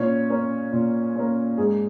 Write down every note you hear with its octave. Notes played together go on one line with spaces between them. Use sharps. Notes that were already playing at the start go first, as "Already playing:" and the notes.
Already playing: A#2 C#4 C#5
A#3 C#4
A#2
A#3 C#4
G#2 G#4